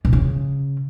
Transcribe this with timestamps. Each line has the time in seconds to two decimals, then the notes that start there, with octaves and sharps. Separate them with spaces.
0.05 B2
0.13 C#3